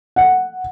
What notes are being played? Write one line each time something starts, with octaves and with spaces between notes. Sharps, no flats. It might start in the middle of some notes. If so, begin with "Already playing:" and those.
F#5